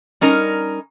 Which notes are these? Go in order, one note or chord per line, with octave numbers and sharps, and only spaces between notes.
G3 C#4 D#4 A#4